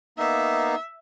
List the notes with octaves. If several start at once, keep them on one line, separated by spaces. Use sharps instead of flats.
A#3 B3 D#4 E5